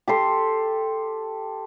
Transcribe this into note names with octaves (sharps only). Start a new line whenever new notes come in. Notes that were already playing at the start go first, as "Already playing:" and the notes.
G4 A4 C6